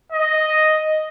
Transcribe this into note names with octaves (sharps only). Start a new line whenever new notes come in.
D#5